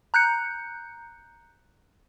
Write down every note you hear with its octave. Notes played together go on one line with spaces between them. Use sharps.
A#5 F#6 G6 C#7